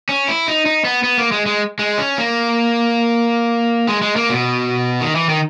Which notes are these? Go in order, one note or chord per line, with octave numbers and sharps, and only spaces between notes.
C#4
E4
D#4
D#4
B3
B3
A#3
G#3
G#3
G#3
C#4
A#3
G#3
G#3
A#3
B2
D#3
E3
D#3